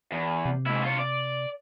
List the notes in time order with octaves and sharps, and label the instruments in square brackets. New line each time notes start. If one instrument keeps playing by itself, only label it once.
[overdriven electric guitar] E2
[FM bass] C3
[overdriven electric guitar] G#2 E4
F4 C#5
D5